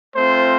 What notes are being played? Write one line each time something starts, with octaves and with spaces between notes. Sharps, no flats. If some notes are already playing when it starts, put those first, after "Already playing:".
A3 C4 F4 C5